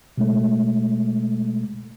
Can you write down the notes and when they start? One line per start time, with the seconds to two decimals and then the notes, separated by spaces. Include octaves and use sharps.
0.18 B2 G#3 A3